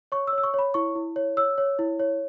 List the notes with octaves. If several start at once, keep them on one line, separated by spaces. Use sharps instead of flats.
C#5 C#6
E6
C#5
E6
C#6
C#5 B5
E4 C#6
E4
C#5
C#5 E6
C#5
E4
C#5